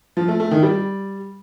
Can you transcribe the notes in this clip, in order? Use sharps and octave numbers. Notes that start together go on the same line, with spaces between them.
F3
A3
A3
D#3
G3